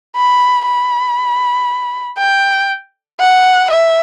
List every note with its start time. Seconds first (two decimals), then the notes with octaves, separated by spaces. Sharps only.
0.16 B5
0.66 B5
2.18 G5
3.19 F#5
3.71 E5